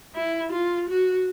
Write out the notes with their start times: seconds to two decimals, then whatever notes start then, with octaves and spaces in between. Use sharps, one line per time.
0.15 E4
0.52 F4
0.89 F#4